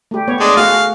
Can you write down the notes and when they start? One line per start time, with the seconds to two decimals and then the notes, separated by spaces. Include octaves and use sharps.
0.11 A3 G4
0.28 B3 C#5
0.40 G#3 D4
0.57 A3 F#4 G#4 F5